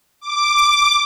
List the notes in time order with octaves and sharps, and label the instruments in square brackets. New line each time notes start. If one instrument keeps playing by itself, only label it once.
[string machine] D6